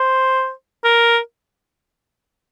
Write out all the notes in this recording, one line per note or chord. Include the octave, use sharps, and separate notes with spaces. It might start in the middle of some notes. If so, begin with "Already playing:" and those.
Already playing: C5
A#4